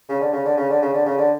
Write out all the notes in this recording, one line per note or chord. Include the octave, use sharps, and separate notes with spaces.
C#3
D3
C#3
D3
C#3
D3
C#3
D3
C#3
D3